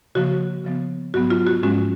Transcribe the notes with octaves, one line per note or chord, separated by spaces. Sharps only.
C#3 F3 A#3 F#4
C#3 F3 B3
G#2 F#3 B3 F#4
F4
F#4
G#2 F3 G#3 C#4 F#4